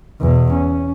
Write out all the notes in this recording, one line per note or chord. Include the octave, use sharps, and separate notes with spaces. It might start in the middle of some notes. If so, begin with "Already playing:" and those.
E2 B2
C#4